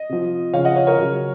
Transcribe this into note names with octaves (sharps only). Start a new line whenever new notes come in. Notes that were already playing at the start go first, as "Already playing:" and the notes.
Already playing: D#5
C3 F3
C#3 F3 C#5 F5
D#5 F#5
C#5 F5
A#4 C#5
C#3 F#3